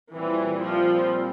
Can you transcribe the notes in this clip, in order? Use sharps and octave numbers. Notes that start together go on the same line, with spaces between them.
A#2 E3 G3 C4
F3